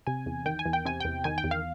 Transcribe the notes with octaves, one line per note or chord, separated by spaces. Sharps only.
C3 G#5
E2
D#3 G5
G#5
E2
G5
C3 G#5
E2 G5
D#3 G#5
G5
E2
F5